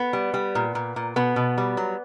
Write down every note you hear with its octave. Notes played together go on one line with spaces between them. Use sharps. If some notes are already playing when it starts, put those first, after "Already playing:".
Already playing: B3
G3
G3
A#2
A#2
A#2
B2 B3
B2
G3
F#3